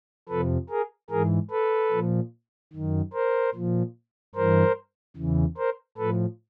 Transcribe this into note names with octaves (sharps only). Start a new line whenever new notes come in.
F2 C3 F3 A4 B4
G#4 A#4
G#2 E3 G#4 A#4
A4 B4
A#2 F3
F#2 D#3
A#4 C5
A#2 F3
G2 E3 A#4 C5
E2 C#3 E3
A#4 C5
A2 F3 A4 B4